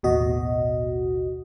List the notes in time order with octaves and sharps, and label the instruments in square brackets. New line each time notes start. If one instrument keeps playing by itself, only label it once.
[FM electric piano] A1 D#2 B2 F#4 D#5